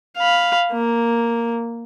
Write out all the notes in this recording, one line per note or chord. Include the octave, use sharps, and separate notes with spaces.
F5 B5
A#3